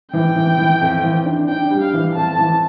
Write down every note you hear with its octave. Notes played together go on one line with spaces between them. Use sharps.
E3 G5
E3
E3
F2
E3
D4
D4 G5
G3
F5
E3
F2 A5
E3